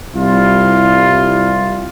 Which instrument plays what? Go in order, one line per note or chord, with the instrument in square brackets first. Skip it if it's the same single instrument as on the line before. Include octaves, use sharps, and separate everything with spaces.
[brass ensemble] C2 G3 E4 F4